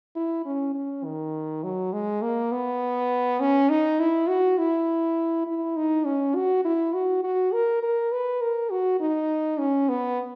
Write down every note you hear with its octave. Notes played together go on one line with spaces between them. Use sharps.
E4
C#4
C#4
D#3
F#3
G#3
A#3
B3
C#4
D#4
E4
F#4
E4
E4
D#4
C#4
F#4
E4
F#4
F#4
A#4
A#4
B4
A#4
F#4
D#4
C#4
B3